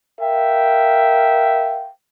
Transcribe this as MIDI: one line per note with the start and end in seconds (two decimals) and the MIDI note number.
0.20 1.90 70
0.20 1.90 76
0.20 1.90 77
0.20 1.90 79